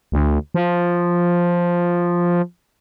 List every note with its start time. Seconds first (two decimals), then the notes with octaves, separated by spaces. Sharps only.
0.12 D2
0.54 F3